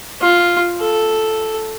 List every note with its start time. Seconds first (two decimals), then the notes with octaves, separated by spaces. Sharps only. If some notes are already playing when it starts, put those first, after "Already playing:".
0.21 F4
0.81 A4